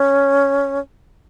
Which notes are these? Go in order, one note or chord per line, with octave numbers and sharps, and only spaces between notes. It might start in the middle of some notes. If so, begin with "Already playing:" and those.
Already playing: C#4